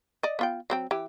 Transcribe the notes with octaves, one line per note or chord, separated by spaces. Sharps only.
D5 D#5
B3 F4 G5
F#3 C4 G5
E3 G4